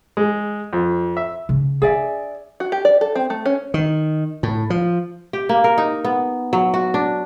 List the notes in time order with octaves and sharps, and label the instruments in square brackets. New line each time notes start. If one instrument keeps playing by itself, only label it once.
[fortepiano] G#3
F2
E5
[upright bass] C#3
[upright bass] D4 [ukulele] G#4 D5 E5
[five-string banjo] F#4
G4
D5
A4
C4
A3
C#4
[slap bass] D#3
A2
F3
[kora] G4
A#3
A#4
D#4
B3
F#3
F#4
D4